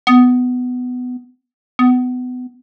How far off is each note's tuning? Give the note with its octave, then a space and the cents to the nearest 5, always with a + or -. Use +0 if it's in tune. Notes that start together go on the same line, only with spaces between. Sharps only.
B3 +15
B3 +25